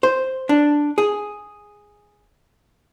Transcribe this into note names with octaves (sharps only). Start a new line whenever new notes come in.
C5
D4
G#4